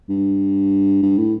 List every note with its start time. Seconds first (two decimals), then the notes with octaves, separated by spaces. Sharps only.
0.09 G2
1.02 G2
1.18 A2